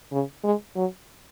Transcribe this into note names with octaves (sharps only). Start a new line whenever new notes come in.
C#3
G#3
F#3